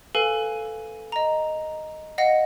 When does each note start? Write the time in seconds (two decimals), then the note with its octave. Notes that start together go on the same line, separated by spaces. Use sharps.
0.15 A4 B4 F5 G#5
1.12 D#5 A#5
2.18 D#5 F5 F#5 A#6 C#7